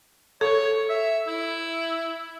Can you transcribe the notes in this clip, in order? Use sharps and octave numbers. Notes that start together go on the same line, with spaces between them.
A4 C#5
E5
E4